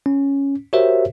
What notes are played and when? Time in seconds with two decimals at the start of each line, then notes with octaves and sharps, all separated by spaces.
0.06 C#4
0.73 F#4 G4 A#4 C5 C#5 E5